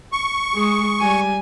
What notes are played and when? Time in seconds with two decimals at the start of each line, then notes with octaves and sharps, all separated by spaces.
0.12 C#6
0.53 G#3 G#4
0.99 G3 G#5